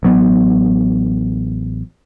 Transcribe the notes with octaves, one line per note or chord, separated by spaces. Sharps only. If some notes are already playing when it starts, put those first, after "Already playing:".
A1 F#3 B3